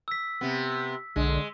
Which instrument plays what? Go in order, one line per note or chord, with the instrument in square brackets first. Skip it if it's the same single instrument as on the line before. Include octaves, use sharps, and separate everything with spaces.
[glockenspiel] E6 B6
[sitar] C3 B3
[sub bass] B1 [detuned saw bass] D3 [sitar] G#3